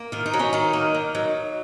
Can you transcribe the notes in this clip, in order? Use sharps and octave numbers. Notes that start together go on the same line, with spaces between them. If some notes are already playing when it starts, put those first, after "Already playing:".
Already playing: A#3
D#3 F4
D#4
F#3
C#4
D#3 D#4
A#3
D#3
F#3